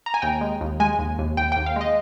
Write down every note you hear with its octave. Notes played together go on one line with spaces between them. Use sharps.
A#5
G#5
D#2 G5
G#3
D#2
G#3 G#5
D#2
D#2
D#2 G5
D#2 G5
F5
G#3 D#5